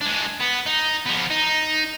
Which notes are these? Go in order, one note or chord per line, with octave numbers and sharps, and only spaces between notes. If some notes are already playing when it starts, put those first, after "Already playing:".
G#3 D4
B3
D#4
F3 B3
D#4